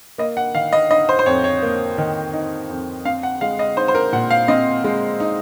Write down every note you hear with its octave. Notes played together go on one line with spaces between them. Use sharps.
A#3 D#5
F#5
D#3 F5
D#5
D#4 D#5
C5
C5
F2 C#5
C#5
A#3
D#3
D#4
F2
C4 F5
F#5
G#3 F5
D#5
D#4 C5
C5
A#4
A#2 F#5
F5
C4 D#5
G#3
D#4